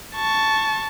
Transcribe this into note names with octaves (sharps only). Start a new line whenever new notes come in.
A5 C#6